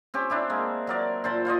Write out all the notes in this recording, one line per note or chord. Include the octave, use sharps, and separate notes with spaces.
C4 C#4 G4
D4 E4 G4
G#3 A#3
F#3 A#4 D5
A#2 C5 A5 B5
F4 C5 D5 D#5